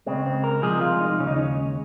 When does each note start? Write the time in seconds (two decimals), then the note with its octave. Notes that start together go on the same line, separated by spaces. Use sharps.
0.06 C#2 C#3 G#3 C4
0.26 C4
0.44 A#4
0.62 C2 C3 F3 G#3 G#4
0.81 F4
1.01 D#4
1.19 D#2 C#3 G#3 C#4
1.27 D#4
1.36 C#4